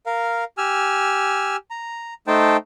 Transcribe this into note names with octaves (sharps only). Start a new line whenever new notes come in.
A#4 F5
G4 G#5 E6 F6
A#5
A3 D#4 C5 G5 A5